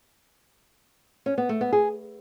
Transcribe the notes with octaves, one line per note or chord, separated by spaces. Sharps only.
C#4
B3
A3
B3
G#4